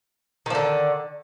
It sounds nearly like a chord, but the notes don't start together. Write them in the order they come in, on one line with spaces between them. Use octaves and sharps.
D#3 F3 D3